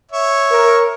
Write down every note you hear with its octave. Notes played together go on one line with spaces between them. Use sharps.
C#5 E5
A#4